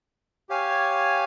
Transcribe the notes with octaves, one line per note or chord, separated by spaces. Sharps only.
G4 C#5 F5 G#5